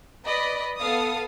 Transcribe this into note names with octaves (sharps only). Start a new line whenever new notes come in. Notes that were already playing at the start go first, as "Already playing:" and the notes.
B4 D5 D#5 B5
B3 A4 F5 D#6